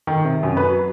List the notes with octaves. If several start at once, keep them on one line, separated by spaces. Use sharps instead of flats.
D#3
C3
F#2
B4
F#3